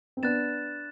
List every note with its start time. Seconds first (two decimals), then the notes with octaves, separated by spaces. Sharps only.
0.17 C4
0.23 B3 D4 F#6 A6 E7